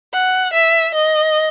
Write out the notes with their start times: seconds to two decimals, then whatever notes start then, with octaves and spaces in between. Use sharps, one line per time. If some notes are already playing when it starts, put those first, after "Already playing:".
0.13 F#5
0.53 E5
0.94 D#5